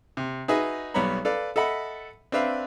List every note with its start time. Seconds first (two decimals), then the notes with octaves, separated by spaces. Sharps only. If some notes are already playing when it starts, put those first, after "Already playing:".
0.17 C3
0.48 D#4 F#4 G#4 B4 D#5 E5
0.94 B1 G3 B3 C#5 A#5 B5
1.25 A4 B4 D5 F5
1.56 A4 D#5 E5 F#5 B5
2.32 C4 D4 B4 E5 F5